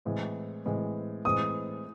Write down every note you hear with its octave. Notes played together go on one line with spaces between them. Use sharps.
A2 E3 G#3 C4
A2 E3 G#3 C4
A2 E3 G#3 C4 D#6